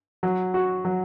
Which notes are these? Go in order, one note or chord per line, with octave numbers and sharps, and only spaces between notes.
F#3
F#4
F#3